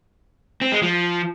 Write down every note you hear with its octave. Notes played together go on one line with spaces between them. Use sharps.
C4
G#3
F3